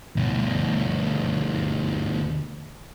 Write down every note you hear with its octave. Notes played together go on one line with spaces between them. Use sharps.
D2 B2